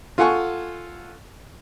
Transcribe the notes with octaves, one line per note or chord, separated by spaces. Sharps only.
F4 A4 F#5 G#5 C#6